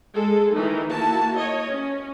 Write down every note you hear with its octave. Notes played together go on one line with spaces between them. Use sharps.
G#3 A4
D#3 E3 D#4
A#3 E4 F#4 A5
C#5 D#5
C#4